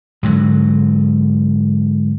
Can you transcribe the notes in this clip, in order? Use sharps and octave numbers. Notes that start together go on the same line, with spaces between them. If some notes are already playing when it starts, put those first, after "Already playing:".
G#2 D3 F#3